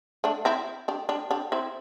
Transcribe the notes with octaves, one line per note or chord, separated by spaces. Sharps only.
A3 D4
C4 E4
D4 G4
D4 G4
D4 G4
C4 E4